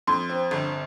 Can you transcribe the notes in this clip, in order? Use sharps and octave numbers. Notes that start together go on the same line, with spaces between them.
F2 C6
C4
G1